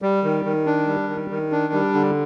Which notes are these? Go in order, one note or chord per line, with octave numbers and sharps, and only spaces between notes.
G3
D#3
D#3
D4
G3
D#3
D#3
D4
G3
D3